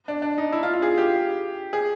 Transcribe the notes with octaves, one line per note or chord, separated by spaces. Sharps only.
D4
D4
D#4
E4
F4
F4
G#4
G4
G#4